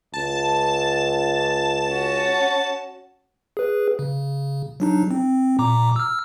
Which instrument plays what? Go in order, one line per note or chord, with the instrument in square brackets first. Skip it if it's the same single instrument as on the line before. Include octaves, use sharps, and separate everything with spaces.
[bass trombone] C#2 [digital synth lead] A5
[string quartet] C#4 F#4
[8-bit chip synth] G#4 B4
C#3
F#3 D4 D#4
C4
A#2 A#5 D6
E6 F6